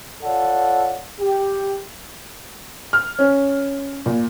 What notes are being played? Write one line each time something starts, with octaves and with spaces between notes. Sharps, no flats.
F4 A4 C#5 D5 F#5
G4
F6
C#4
A#2